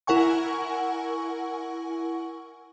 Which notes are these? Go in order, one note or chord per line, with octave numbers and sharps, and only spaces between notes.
E4 A#4 F#5 G#5 C#6